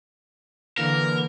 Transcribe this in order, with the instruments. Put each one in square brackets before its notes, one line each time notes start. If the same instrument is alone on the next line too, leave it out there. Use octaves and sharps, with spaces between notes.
[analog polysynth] D3 E3 A#3 [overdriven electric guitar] A#4